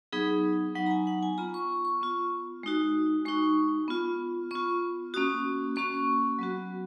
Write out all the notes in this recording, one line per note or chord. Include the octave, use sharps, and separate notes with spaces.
F#3 B3 D#4 G#4
F#3 B3 D#4 F#5
A#5
G#5
F#5
G#5
B3 F4 A#5
C#6
C#6
C#6
B3 F4
G#3 D#4 F#4
G#3 D#4 F#4 C#6
B3 F4
B3 F4 C#6
A#3 C#4 F#4 D#6
A#3 C#4 F#4 C#6
F#3 B3 F#4